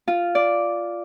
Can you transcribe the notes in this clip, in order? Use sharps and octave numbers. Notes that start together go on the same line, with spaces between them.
F4
D5